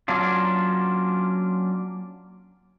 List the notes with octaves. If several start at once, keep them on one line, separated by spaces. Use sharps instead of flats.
F#3 A#3 C#4 D4 F4